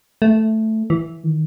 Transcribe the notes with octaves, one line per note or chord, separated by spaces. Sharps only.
A3
E3
D#3